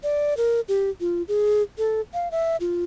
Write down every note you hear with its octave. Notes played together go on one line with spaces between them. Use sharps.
D5
A#4
G4
F4
G#4
A4
F5
E5
F4